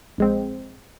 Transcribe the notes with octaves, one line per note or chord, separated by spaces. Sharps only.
A#1 G#3 C4